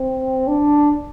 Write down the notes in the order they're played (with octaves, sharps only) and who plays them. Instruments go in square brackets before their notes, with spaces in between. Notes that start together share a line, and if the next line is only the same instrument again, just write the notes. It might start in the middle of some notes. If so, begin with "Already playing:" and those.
Already playing: [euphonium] C4
D4